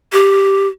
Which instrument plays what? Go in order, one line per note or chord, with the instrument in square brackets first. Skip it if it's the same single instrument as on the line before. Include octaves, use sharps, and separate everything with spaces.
[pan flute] G4